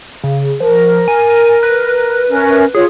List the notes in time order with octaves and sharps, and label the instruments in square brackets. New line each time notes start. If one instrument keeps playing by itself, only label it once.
[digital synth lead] C#3
[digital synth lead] F3 [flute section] A#4
[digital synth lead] G#5
B4
[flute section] C#4 A#4 E5
[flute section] F4 C#5 [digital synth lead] G#4